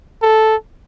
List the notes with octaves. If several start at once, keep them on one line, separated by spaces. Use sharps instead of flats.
A4